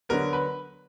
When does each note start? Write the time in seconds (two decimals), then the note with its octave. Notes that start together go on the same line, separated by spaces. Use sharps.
0.09 D3 F#3 B3 A#4
0.33 B4